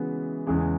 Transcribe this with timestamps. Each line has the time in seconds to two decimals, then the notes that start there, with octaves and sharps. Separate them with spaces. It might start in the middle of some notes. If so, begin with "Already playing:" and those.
Already playing: C#3 E3 G#3 B3 F#4
0.47 E2 C#3 E3 G#3